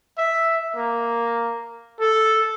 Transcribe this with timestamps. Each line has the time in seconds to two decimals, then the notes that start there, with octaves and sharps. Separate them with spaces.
0.18 E5
0.76 A#3
2.00 A4